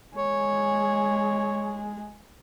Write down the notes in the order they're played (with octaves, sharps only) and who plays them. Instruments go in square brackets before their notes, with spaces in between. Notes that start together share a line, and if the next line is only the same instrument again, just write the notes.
[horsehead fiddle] G#3 G#4 [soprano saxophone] C#5